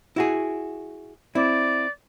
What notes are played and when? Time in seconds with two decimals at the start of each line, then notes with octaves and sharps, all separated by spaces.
0.16 E4 F#4 G#4
1.35 C4 E4 D5